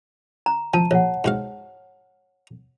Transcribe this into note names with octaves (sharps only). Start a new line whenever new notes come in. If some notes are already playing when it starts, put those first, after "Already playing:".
A#5
F3 A5
A#1 C#5 F#5
G#2 F#4 F5